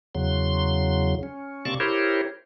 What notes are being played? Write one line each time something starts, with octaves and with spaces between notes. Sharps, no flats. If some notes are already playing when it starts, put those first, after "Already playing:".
E2 C#3 F#3 C6
C#4
C3 A#3 C4 D5 A5 C#6
E4 G4 A#4 C5 C#5